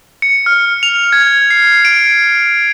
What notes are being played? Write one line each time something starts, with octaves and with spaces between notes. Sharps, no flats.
C#7
F6
F7
G#6
C7
D7